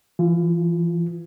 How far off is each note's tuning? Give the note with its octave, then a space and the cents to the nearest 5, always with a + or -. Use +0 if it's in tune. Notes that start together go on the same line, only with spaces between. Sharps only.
E3 +30 F4 +0